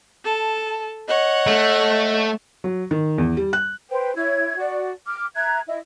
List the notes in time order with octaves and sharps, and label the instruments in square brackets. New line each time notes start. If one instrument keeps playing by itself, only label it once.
[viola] A4 [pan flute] A5
[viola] C#5 F#5 [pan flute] D#5
[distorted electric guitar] A3
[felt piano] F#3
D#3
E2
G3
F#6
[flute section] B4 C5 G5
E4 C#5 G#6
F#4 D5
D6 F6
E5 A#5 F#6 G#6
E4 D#5